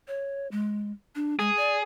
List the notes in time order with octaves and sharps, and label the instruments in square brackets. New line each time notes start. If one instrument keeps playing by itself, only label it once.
[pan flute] C#5
G#3
D4
[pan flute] G#3 [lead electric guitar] G#4
[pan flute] D5